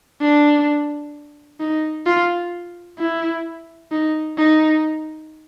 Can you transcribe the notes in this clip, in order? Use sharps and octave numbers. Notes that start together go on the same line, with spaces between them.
D4
D#4
F4
E4
D#4
D#4